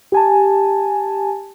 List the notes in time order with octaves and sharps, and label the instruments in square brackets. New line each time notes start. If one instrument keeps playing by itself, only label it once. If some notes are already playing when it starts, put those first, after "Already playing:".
[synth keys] G4 G#5 A5